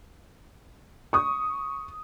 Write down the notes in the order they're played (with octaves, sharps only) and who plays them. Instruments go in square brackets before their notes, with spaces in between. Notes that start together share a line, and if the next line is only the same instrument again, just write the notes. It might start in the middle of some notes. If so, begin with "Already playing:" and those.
[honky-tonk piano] C#6 D#6